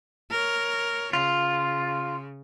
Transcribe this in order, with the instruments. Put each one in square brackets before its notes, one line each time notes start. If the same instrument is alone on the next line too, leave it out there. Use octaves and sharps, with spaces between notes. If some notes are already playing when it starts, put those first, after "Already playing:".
[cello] A#4 C#5
[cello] C#3 [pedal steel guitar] F4